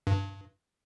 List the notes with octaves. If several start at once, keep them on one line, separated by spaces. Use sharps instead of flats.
G2